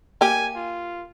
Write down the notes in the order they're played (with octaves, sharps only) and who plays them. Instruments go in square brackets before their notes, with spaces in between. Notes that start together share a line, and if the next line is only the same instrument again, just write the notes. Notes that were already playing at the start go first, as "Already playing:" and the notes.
[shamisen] A#3 G4 [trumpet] G#5
[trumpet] F4